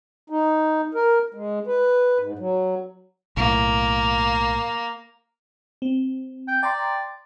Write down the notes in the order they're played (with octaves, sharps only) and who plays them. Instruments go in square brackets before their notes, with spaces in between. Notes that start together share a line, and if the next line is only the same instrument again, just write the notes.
[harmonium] D#4
A#4
G#3
B4
G#2
F#3
[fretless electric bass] B1 A2 [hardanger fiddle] A#3
[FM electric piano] C4
[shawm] G5
[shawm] D5 [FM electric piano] G5 A#5 C6